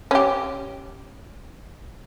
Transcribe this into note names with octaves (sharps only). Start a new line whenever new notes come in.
C#4 G4